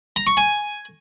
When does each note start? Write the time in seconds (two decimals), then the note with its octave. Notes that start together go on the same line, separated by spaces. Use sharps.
0.16 A#5
0.27 C#6
0.37 G#5